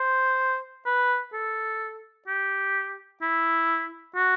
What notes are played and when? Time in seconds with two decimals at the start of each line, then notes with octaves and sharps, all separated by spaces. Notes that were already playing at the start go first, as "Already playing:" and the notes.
Already playing: C5
0.86 B4
1.33 A4
2.27 G4
3.22 E4
4.16 F#4